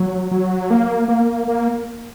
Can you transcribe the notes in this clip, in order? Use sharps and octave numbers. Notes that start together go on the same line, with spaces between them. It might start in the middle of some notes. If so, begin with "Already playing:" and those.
Already playing: F#3
F#3
A#3
A#3
A#3